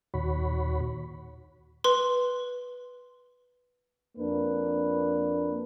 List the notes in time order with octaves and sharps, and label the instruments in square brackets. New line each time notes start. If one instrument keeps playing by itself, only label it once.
[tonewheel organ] D#2 A#2 D#3 F#4 C#5 B5
[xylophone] B4 C6
[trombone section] F2 A#3 D4 B4